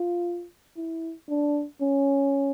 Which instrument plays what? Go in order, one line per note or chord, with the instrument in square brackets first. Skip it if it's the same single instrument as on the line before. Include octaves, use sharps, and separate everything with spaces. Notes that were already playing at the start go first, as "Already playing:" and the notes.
Already playing: [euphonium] F4
E4
D4
C#4